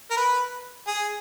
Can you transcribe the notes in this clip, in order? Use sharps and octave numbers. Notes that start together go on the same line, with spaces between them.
A#4
B4
G#4